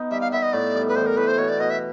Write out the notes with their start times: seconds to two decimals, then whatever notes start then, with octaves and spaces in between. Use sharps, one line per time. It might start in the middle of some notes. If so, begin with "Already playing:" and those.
Already playing: B3 D#4
0.11 G3 E5
0.21 F5
0.32 B3 E5
0.43 D#5
0.53 A2 D5
0.75 G3
0.88 B4
0.96 E3 C5
1.06 A#4
1.17 A2 B4
1.28 C5
1.38 B2 C#5
1.49 D5
1.60 B2 D#5
1.70 E5